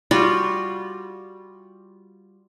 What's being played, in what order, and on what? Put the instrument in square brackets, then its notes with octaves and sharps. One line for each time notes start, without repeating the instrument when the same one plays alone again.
[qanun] G3 F4 F#4